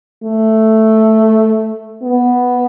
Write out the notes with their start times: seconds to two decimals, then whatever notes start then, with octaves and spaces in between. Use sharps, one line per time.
0.23 A3
2.03 B3